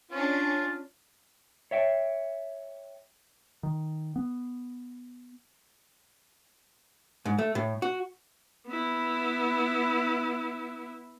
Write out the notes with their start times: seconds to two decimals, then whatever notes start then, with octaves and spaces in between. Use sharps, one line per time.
0.11 C#4 D4 F4
1.71 C#5 E5 G5
3.63 D#3
4.16 B3
7.25 G#2
7.38 A3
7.55 A2
7.82 F#4
8.67 B3 E4